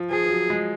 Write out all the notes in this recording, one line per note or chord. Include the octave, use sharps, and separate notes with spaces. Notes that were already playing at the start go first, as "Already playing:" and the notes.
Already playing: F3
F3 G#4
F3
F#3
G#3